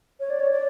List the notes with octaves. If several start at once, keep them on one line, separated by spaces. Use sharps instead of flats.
C#5
D5
C#5
D5